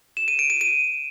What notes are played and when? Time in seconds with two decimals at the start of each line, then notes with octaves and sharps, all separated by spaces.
0.17 E7
0.28 D#7
0.39 D7
0.50 D#7
0.61 D#7